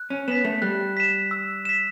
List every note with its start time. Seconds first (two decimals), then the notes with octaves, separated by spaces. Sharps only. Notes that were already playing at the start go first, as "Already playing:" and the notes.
Already playing: F#6
0.10 C#4
0.28 B3 B6 E7
0.45 A3
0.62 G3 F#6
0.97 B6 E7
1.31 E6
1.65 B6 E7